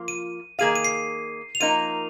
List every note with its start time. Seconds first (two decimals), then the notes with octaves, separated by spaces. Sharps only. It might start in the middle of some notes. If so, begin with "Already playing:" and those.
Already playing: F3 A#3 F4
0.08 D#7
0.59 D#3 A#3 G#4 F5 D#7
0.75 D#7
0.85 C7
1.55 F7
1.60 F3 A#3 D#4 A#4 D#7